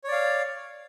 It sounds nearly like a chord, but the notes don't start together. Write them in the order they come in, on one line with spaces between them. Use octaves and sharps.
C#5 D5 F5